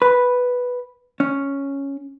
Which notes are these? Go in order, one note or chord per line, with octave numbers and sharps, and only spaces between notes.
B4
C#4